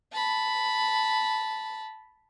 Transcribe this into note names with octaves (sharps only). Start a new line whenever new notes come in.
A5 B5